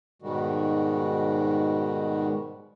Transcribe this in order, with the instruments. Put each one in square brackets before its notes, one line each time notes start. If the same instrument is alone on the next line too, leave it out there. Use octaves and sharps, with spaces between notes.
[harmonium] G#2 B2 D#3 G3 G#3 F#4